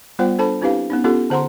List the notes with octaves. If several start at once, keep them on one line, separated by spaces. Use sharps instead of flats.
G3 B3 F4 C5 F#5 G5
D4 A4 C5 A5 B5
C4 D4 E4 G4 B4 F5
B3 C#4 D#4
B3 C#4 F4 G4 A4
D3 C5 F#5 A#5 C6